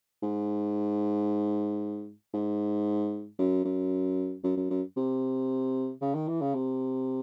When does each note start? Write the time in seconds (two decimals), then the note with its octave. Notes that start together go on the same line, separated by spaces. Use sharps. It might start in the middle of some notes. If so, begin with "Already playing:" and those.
0.23 G#2
2.34 G#2
3.38 F#2
3.65 F#2
4.44 F#2
4.57 F#2
4.70 F#2
4.97 C3
6.01 C#3
6.15 D#3
6.28 E3
6.41 C#3
6.54 C3